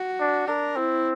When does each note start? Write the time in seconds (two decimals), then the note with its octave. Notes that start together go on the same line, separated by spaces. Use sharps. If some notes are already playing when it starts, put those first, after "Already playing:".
Already playing: F#4
0.20 D4
0.48 D4 A#4
0.76 C4 E4